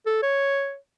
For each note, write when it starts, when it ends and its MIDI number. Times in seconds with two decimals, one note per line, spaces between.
0.06 0.21 69
0.22 0.76 73